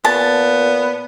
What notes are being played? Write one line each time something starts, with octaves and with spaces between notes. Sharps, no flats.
A#2 B3 A5